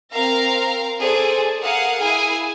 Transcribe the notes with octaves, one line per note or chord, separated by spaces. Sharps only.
C4 A#4 F5 A#5
G#4 A4 C5 D5
G#4 A#4 F5 F#5
E4 G#4 G#5